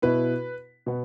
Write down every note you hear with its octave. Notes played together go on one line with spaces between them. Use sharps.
B2 B3 E4 B4
B2 B3